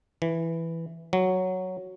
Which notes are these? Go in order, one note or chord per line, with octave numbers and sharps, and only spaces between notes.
E3
F#3